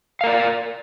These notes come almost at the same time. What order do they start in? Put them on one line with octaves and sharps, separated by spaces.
F5 A#4 D5